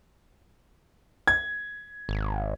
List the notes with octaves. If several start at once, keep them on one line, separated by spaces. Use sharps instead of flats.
G#6
G#1